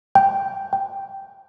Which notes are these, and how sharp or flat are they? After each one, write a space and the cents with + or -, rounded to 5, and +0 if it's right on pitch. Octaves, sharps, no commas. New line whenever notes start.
G5 -5
G5 -5